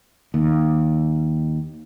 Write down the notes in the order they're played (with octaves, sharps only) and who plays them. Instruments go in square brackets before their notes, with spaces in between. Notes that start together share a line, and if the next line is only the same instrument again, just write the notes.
[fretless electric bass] D#2